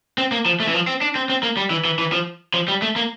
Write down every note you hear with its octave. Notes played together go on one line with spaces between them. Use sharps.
C4
A#3
F3
A3
E3
F3
C4
D4
C4
C4
A#3
G3
E3
E3
E3
F3
F3
G3
A3
A#3